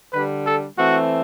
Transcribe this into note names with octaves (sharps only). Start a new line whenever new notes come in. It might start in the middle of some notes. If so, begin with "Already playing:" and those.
D3 G3 D4 B4
A4
E3 A3 C4 F#4